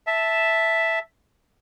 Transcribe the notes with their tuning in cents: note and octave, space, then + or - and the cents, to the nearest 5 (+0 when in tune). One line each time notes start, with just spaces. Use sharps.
E5 +0 A5 +0